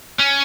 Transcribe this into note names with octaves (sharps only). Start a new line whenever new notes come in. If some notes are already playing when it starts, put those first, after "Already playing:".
C#4